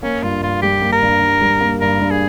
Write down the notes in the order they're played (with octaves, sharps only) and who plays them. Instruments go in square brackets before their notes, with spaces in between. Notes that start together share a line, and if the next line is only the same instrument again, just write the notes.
[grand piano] A#3 [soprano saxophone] C#4
[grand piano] G2 [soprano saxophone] F4
[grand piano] G2 [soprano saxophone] F4
[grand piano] G3 [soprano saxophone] G4
[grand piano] A#3
[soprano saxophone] A#4
[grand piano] G2
G2
G3
A#3
[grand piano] G2 [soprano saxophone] A#4
[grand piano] G2
[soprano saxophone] G#4